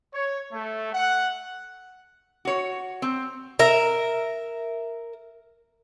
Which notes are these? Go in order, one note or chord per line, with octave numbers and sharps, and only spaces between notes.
C#5
A3
F#5
F#4 C#5
C4
A#4 E5